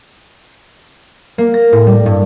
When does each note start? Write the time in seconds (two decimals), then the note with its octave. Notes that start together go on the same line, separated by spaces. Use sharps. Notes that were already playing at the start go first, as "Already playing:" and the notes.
1.38 A#3
1.54 A#6
1.72 A2
1.86 G3
2.06 G2